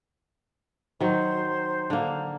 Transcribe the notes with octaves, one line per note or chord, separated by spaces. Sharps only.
D#3 F#3 C5
D3 A#3